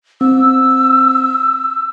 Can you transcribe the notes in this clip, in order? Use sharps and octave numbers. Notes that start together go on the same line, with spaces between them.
C4 E6